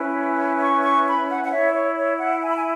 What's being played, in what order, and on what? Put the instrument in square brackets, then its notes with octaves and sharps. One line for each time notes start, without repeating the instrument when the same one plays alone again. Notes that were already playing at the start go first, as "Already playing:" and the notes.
Already playing: [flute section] C#4 E4 B4
C#6
C#6
B5
F#5
F#5
E4 C#5 E5
C#5
C#5
F#5
G#5
B5
G#5